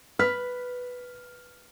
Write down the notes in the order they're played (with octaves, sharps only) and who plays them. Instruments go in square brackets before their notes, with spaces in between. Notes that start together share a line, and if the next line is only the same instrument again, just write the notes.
[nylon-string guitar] B4 [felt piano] F6 B6